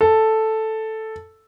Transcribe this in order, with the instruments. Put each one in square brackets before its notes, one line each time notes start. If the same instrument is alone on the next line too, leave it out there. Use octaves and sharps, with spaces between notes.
[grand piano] A4